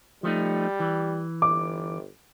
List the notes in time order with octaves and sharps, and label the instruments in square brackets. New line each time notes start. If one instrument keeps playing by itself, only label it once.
[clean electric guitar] F3 A3 D#4 [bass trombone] G3
[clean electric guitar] E3
[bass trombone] G1 [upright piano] D6